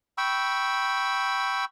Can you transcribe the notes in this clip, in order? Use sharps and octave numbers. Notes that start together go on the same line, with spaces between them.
G5 B5 C#6 E6